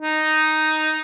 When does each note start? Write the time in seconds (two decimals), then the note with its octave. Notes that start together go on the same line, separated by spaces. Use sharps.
0.02 D#4